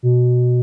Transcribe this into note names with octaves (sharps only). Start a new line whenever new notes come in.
B2